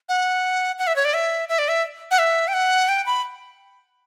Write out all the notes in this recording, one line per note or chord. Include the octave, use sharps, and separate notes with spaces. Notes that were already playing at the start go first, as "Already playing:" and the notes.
F#5
F#5
E5
C#5
D5
E5
E5
D5
E5
F#5
E5
G5
F#5
G5
B5